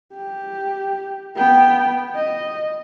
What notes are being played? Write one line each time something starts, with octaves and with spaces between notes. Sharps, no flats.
G4
B3 G5
D#5